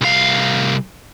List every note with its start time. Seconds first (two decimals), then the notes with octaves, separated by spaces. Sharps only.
0.01 C2 F5